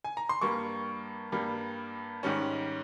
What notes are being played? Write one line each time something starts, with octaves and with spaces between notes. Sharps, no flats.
G#5
A#5
C6
G2 G3 A#3 C#6
G2 G3 A#3
G#2 D#3 G3 C#4